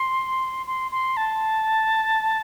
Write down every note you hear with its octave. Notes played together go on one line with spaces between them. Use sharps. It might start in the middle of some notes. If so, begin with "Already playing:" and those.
Already playing: C6
C6
C6
A5